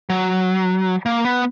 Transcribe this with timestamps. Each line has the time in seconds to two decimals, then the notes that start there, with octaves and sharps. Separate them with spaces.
0.10 F#3
1.06 A#3
1.25 B3